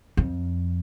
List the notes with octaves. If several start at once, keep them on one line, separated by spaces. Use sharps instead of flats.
F2